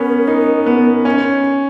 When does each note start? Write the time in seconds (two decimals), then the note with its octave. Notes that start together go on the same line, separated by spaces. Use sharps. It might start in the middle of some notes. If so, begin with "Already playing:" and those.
Already playing: B3 C#4 A#4
0.28 D#4
0.66 B3
1.05 C#4